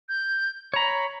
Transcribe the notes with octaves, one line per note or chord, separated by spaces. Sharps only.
G6
C#5 A#5 B5